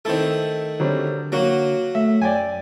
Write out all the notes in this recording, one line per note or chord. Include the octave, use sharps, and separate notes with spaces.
D#3 A3 C4 E4 A4
D3 F#3 G3 C4
F#3 A#3 F#4
A3 E5
F#2 D5 G5 G#5